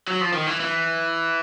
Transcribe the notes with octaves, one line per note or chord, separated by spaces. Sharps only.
F#3
F3
D#3
E3
E3